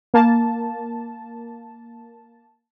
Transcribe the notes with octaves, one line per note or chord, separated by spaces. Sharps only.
A#3 A5